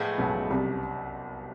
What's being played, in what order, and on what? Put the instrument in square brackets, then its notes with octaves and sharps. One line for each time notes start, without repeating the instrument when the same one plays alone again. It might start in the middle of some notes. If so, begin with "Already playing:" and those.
Already playing: [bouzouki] A2 F3 G#3 B3
[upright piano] B1 B2
C2 C3